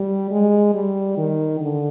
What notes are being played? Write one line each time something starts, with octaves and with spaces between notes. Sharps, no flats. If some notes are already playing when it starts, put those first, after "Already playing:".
Already playing: G3
G#3
G3
D#3
D3